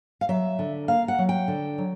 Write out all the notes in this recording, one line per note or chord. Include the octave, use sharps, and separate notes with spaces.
F5
F#3 E5
D3
A#3 F5
F#5
F#3
G5
D3
F#3